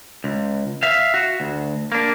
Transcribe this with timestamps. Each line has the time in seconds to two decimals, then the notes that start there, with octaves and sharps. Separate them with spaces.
0.24 C#2
0.83 E5 F5
1.14 F#4
1.40 D2
1.92 A#3 D4